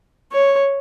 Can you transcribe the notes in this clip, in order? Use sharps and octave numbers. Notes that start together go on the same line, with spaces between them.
C#5